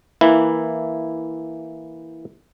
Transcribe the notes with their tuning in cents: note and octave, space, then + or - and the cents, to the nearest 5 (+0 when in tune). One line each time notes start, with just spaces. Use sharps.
E3 -5 A#3 +0 E4 +0